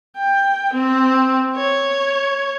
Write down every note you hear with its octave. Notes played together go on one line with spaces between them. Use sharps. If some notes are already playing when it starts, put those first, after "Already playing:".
G5
C4
C#5